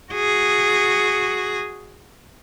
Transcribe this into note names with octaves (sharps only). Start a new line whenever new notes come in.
F#4 G#4